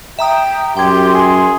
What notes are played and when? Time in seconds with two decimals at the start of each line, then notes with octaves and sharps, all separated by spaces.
0.19 E5 G5 A#5 D#6
0.77 F#2 G4 G5 C6 G#6
1.14 G#4